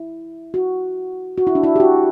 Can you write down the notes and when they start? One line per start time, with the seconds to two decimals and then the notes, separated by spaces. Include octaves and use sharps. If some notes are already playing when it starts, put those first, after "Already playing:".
Already playing: E4
0.54 F#4
1.38 F#4
1.47 E4
1.55 D4
1.63 E4
1.76 G4
1.80 F#4